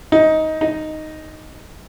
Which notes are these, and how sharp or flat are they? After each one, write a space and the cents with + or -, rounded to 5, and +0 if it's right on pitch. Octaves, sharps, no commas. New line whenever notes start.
D#4 +15
D#4 +0